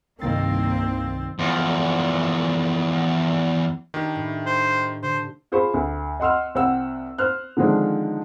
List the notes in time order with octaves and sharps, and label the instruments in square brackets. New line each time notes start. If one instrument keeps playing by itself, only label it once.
[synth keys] C2 D#3 A6 [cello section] G2 A#3 [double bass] C4
[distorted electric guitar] E2 F3
[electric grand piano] D#3 [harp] D4 G4
[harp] A2
[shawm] C5
[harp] D3 [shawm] C5
[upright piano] F4 G#4 C5 B5 C#6
D2
D#5 F#5 C6 E6 F6
C2 C4 F#5 E6
C5 F6 F#6
D3 D#3 F3 G#3 C4 D4